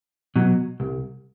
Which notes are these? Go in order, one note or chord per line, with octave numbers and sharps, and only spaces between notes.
B2 F#3
C2